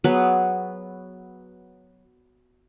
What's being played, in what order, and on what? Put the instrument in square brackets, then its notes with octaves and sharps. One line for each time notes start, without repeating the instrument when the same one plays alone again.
[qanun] F#3 B3 G#4 B4